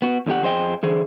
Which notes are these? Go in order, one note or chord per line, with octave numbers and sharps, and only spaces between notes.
B3 F#4
E2 D3 G3 G4 F#5
F2 G#4 C5 D#5 G5
D3 E3 G#4 C5